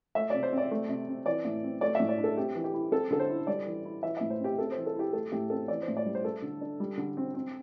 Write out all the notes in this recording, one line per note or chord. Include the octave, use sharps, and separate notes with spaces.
A3 E5
C3 D5
C5
C4
D5
A3
C3
C4
E3 D5
A2
C4
A3 D5
A2 E5
D5
D4
A4
C4 G4
E3
G4
E4
C4 A4
D3 A4
C5
E4
G3 D5
E3
E4
E3 E5
A2 E5
C5
C4 G4
C4 A4
E3 C5
A4
E4 G4
A3 A4
A2 G4
C4 A4
E3 D5
C5
A2
D5
G3
C5
A3 A4
D3
D4
G3
D3
C4
C4